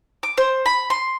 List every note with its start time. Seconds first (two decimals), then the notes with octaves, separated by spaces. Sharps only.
0.23 D6
0.38 C5
0.66 B5
0.90 C6